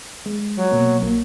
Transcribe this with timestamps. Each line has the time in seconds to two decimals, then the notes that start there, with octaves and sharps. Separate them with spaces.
0.26 G#3
0.56 F#3
0.71 B2 A#3
1.02 A#1 A#3